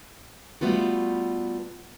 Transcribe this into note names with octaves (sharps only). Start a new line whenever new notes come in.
G3 A3 B3 F4 F#4